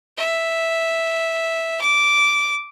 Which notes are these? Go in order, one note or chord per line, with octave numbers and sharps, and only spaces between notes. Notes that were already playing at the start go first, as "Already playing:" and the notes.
E5
D6